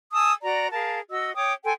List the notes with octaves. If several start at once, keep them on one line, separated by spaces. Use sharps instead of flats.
G#5 A5 D#6 E6
F#4 D5 A#5
G#4 A#4 F5 A5
F#4 D#5 E6
C#5 G5 D6 D#6
A4 G5 G#5 C6